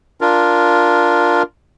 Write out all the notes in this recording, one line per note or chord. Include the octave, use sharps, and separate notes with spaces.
D4 F4 A#4